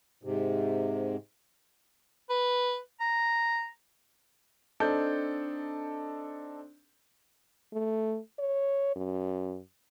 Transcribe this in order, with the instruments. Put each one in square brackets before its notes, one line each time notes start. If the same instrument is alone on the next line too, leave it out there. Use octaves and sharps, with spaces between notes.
[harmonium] G#2 C3
[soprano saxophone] B4
A#5
[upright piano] C4 D4 D#4 A4 G6
[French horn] A3
C#5
F#2